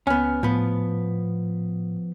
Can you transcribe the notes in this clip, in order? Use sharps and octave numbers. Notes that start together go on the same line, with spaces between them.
C#2 B3 C#4 G#5 F6
A2 F3 B3